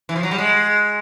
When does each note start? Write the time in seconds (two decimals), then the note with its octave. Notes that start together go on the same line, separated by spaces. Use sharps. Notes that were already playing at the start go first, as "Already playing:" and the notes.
0.09 E3
0.16 F3
0.23 F#3
0.31 G3
0.38 G#3